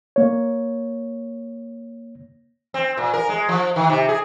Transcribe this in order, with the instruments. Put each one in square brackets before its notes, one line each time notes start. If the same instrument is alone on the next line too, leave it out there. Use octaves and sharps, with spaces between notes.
[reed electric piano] A#3 C#5
[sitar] C4
A#2
A#4
G#3
F3
D#3
C3
G#4